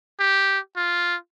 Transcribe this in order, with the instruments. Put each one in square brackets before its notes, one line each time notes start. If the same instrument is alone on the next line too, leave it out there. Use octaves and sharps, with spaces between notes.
[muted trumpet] G4
F4